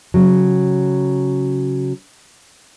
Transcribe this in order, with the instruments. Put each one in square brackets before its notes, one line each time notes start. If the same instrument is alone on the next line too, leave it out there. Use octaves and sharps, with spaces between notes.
[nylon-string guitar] C#3 F#3